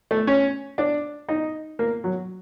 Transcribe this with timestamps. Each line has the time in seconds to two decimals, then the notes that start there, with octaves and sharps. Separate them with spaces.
0.11 A3
0.27 C#4
0.78 D4
1.29 D#4
1.79 A#3
2.04 F#3